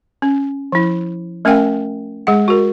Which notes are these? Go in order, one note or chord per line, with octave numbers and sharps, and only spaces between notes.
C#4
F3 E4
A3 C#4 A#4 F5 G5 G#5
G#3 G#4 F#5
F#4 A#4